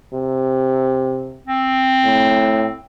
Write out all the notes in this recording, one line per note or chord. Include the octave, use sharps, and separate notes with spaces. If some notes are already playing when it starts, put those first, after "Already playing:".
C3
C4
A2